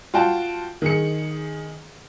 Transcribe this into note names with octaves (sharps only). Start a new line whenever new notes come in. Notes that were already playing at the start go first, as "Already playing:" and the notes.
F4 F#4 G5 A5
D#3 G#4 C#7